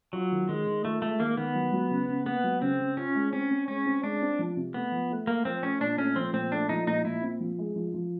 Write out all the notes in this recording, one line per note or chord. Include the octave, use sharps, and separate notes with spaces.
F#3 F4
D#3
D#3 G#3
D#3
A3 F4
G#3 A3
D#3 A#3
D#3 B3
F#3
F#3
C#3
C#3
A#3 B3
F#3
C#3 C4
C#3
C#4 F4
G#3
C4 C#4
C4
G#3 C#4
C4
G#3 D4
C4
F3
C3
A3 B3
F3
A3
A3 A#3
F3 C4
A3 C#4
A#2 D4
A3 C#4
F3 C4
A#2 C4
A3 D4
F3 D#4
A#2 D#4
A#2 E4
C4
F3
G#3
F3
F3